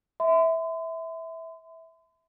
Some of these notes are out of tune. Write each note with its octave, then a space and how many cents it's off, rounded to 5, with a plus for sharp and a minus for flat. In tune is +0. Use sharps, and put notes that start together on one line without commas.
E5 -15 C6 -45